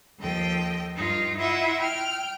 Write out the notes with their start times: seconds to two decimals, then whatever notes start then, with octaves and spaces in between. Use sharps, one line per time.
0.21 D#2 F3 A4 D#5 G5
0.95 G2 D#4 F4
1.37 E4 F4 D#5 E5 F#5
1.78 G5 F6